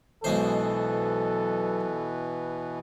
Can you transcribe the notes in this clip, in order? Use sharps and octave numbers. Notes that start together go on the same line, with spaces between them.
B1 B2 E3 G#3 A4 C5